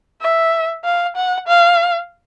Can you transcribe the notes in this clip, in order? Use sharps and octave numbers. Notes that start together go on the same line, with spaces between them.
E5
F5
F#5
F5